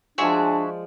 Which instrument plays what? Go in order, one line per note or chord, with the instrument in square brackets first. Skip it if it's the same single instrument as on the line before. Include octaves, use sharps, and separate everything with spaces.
[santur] F3 G#3 D5 [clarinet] D4 [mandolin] F#4 G#4 E5